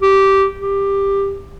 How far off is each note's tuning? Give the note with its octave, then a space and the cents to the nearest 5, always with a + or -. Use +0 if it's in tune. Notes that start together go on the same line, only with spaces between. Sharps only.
G4 -10
G4 +15